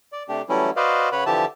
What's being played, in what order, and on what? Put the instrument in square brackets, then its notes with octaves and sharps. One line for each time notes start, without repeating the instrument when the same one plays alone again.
[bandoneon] D5
C3 A3 D4 G4
E3 F#3 G3 A3 C#4 E4
F#4 B4 C5 D5 D#5 F5
C#3 B4 C#5 F#5 B5
D3 E3 F3 G4 E5 A5